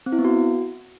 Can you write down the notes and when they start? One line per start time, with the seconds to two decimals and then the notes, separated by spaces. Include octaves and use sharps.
0.06 C4
0.12 E4
0.19 B3
0.25 F#4